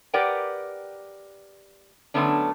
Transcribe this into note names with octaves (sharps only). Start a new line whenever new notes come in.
G4 A#4 B4 D5 F#5 G5
D3 F#3 A3 B3 C#4 D4